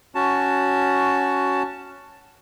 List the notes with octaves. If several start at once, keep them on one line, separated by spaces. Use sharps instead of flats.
C#4 F#4 A5